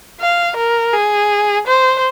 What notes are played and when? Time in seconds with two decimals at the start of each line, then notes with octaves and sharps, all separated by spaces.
0.20 F5
0.57 A#4
0.93 G#4
1.67 C5